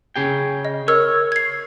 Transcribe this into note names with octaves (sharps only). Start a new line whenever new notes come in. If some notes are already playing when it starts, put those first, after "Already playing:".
C#3 G#4 G5
D#5
A#4 C#5 E6
G#6 C7